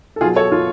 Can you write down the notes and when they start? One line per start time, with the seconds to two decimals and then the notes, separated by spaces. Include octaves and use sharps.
0.16 A4
0.21 B2 F4 G#4
0.25 F#3
0.36 A4 C#5
0.52 F4